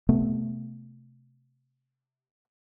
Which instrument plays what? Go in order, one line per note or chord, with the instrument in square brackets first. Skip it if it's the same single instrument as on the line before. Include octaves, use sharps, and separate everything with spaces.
[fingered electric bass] C3 A3 B3